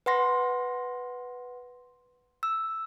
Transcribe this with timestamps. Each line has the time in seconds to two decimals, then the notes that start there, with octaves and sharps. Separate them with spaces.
0.06 B4 F#5 C6 A#6
2.43 E6